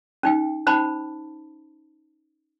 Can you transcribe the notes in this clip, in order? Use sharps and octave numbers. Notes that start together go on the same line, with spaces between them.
C#4 D#4 G5
C#4 D#4 C5 A5 B5